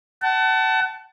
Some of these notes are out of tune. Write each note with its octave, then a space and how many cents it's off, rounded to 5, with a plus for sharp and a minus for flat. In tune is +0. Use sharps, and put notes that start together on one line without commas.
F#5 +35 A5 +0